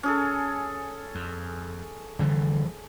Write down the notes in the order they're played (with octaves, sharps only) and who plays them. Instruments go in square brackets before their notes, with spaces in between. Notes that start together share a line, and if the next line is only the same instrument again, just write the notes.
[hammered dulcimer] C#4 G#4 A4
[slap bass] F2
[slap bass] F1 E3 G3 [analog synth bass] D3